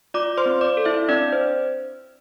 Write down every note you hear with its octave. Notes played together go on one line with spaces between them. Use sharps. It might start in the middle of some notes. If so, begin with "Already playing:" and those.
F4 D5 D6
C5 C6
C4
D5 D6
A4
E4 E5
C4 D4 D5
C5